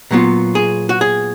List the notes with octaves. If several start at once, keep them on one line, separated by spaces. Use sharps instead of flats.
A#2 F#3 B3 F4
G#4
F#4
G#4